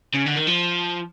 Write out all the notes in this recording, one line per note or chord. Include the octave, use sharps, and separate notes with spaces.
C#3
D3
D#3
F3